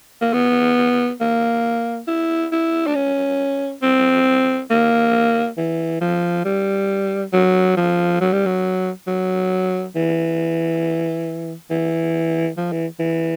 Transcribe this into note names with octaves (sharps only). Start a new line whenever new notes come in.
A#3
B3
A#3
E4
E4
D4
C#4
C4
A#3
E3
F3
G3
F#3
F3
F#3
G3
F#3
F#3
E3
E3
F3
E3
E3